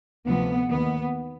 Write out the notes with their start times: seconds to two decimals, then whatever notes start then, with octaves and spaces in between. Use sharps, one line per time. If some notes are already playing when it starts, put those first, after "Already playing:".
0.26 D2 C3 F3 B3
0.69 D#2 D#3 B3